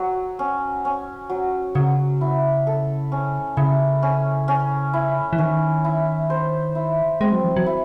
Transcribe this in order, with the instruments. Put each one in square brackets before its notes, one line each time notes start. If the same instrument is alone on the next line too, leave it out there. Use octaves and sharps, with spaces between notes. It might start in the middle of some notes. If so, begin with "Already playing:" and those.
Already playing: [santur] F#3
C#4
C#4
F#3
[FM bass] C#3 [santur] F#3
[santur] E4
A4
C#4
[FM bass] C#3 [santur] E4
[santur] C#4
C#4
E4
[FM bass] E3
[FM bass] D#3 [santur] C#4
[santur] E4
C5
E4
[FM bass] G#3 [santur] C4
[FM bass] F#3
E3
F#3
[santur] E4